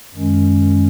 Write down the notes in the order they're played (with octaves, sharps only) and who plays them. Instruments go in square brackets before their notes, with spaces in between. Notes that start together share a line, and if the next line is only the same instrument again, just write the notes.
[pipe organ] F#2 D#3 G#3 C#4